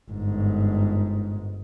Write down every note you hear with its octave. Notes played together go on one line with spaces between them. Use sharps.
G1 G#2